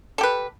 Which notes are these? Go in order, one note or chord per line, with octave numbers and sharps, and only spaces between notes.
G4 A4 B4